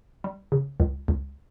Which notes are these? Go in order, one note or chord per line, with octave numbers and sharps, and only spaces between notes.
G3
C#3
C#2
C#2